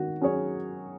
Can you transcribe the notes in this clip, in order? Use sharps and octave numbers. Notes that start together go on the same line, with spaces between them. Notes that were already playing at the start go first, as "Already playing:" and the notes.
Already playing: D#3 F#4
F#3 C#4 G#4 C#5